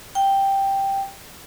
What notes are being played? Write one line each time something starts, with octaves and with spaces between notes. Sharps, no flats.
G5